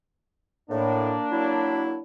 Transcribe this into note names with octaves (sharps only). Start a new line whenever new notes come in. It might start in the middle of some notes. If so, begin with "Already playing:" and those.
A2 A#3 D4
F#3 E4